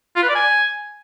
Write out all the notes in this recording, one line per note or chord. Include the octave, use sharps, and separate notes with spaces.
F4
B4
D5
G#5